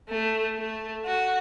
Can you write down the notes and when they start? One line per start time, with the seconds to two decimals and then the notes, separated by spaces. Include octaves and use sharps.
0.10 A3
0.58 A3
1.06 F#4